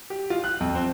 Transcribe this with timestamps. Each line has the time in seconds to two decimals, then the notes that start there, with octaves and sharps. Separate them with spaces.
0.10 G4
0.30 F4
0.44 F#6
0.60 F2
0.75 C4